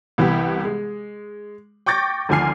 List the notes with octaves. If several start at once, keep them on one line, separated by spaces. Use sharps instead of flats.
C2 E3 B3 G4
G#3
G5 C#6 D6 G6 A6 A#6
G#1 D2 F3 G#5 F6 C7